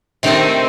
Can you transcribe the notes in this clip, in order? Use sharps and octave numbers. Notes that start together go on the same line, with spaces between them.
C3 D#3 A3 C4 D#4